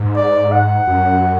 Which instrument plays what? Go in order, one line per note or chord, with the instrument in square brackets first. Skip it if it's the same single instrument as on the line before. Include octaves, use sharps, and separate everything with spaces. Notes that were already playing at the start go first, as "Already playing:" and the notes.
Already playing: [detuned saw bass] G#2
[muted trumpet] D5
F#5
[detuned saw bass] F#2